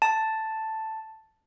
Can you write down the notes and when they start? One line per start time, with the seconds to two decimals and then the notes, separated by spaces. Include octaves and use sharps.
0.02 A5